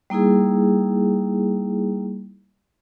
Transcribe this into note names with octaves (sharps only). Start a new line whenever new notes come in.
G3 A#3 D#4 E4 G#4